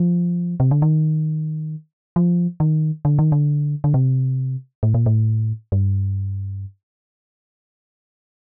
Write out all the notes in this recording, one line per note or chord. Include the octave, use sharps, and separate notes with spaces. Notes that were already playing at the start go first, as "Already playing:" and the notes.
Already playing: F3
C3
D3
D#3
F3
D#3
D3
D#3
D3
D3
C3
A2
A#2
A2
G2